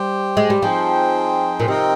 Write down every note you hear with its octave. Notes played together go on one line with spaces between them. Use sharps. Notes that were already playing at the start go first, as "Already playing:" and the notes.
Already playing: G3 G4 C5 G5
G#3
G3
F3 C4 D#4 G#4 C5 G5
A#2
C3 C4 D#4 A#4 D#5 G5